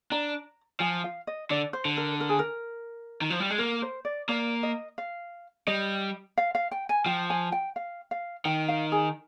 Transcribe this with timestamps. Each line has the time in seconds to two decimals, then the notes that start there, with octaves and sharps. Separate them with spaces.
0.12 D4 A#5
0.80 F3 G#5
1.04 F5
1.27 D#5
1.50 D3 D5
1.73 C5
1.85 D3
1.97 A#4
2.20 A#4
2.29 G#4
2.39 A#4
3.21 D#3
3.30 F3
3.40 G3
3.50 G#3
3.58 A#3 A#4
3.82 C5
4.05 D5
4.29 A#3 D5
4.63 D#5
4.98 F5
5.67 G3 D#5
6.38 F5
6.55 F5
6.71 G5
6.89 G#5
7.06 F3 G5
7.30 G#5
7.52 G5
7.76 F5
8.11 F5
8.45 D#3 G5
8.68 F5
8.92 G#4